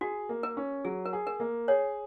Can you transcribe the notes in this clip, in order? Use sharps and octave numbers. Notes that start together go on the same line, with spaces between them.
F#4 G#4
A#3
A#4
C#4
F#3 G#4
A#4
G#4
A#4
A#3
G#4 C#5